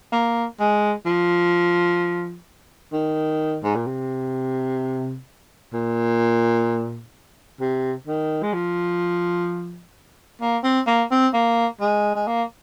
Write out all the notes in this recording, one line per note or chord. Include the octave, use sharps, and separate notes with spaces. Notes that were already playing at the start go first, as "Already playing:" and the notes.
A#3
G#3
F3
D#3
G#2
A#2
C3
A#2
C3
D#3
G#3
F3
A#3
C4
A#3
C4
A#3
G#3
G#3
A#3